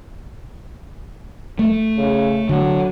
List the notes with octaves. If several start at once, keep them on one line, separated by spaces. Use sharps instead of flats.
A3
C#3
D3 F#3